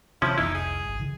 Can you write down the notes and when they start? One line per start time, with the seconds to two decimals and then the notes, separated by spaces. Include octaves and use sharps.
0.22 C3 E3 F3 B3 C#4 E4
0.38 F1 C2 D#4 E4
0.55 G#4
0.83 G#1
0.99 C#3 E3